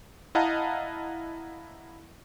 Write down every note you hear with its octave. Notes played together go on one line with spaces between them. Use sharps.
E4 D#5 F5 F#5 A5 A#5